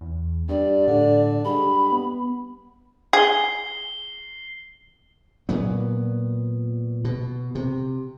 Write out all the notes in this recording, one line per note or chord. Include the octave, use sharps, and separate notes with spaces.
E2
G2 G3 D5
A2 D3
G2 G#3 B5
B3
G#4 C7 G7
A#2 F#3 B3
B2
C3